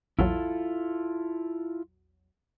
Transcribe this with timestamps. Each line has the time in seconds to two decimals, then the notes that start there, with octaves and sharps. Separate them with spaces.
0.19 A#1 E2 F#3 E4 F4 A4